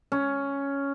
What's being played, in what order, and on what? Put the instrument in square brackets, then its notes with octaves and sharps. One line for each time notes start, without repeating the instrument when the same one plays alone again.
[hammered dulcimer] C#4